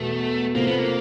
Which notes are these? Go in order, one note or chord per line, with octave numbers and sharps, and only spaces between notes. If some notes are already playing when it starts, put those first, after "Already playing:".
Already playing: E2 B2 A3
C3 F3 A3 A#3 C4
B3
A#3